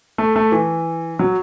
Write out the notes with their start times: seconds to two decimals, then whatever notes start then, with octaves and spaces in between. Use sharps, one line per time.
0.18 A3
0.36 A3
0.52 E3
1.19 F#3